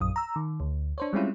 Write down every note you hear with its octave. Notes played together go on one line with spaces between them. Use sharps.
A#1 F#2 D#6
A#5 E6
D#3
D2
D4 C5 C#5
G3 G#3 C4 C#4 E4 F4